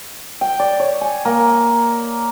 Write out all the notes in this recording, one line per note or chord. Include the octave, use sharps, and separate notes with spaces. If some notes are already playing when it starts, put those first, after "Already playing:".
G5
D5
C#5
G#5
A#3